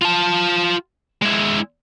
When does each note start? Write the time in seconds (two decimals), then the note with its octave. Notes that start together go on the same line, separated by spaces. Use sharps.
0.02 F4 A5
1.22 G#3 E4